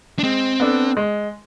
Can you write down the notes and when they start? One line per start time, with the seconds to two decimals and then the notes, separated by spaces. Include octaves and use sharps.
0.19 D4
0.23 G#3 C4
0.60 B3 D4 A4 D5
0.97 G#3